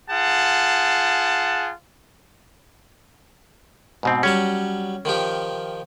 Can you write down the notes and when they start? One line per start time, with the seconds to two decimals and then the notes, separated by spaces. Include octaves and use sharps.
0.10 F4 G#4 F#5 A5
4.03 G#2 B2 C4
4.23 F#3 G3 C#4 A5
5.05 D#3 F3 G4